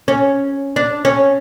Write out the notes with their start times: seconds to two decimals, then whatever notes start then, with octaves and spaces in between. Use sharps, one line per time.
0.08 C#4
0.76 D4
1.05 C#4